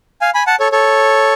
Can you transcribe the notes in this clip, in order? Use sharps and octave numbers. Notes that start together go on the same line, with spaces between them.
F5 G#5
G#5 B5
F#5 A5
A4 C#5
A4 C#5